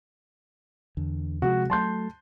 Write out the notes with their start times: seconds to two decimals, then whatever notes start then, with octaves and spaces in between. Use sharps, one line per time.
0.97 E2 D3
1.42 C3 F3 G#3 F#4
1.70 F#3 A3 A5 C6 G6